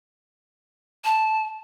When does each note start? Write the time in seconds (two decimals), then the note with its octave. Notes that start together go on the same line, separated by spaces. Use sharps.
1.05 A5